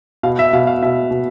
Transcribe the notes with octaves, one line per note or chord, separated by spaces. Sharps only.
B2 F5
E5
B2 F5
F5
B2 E5
B2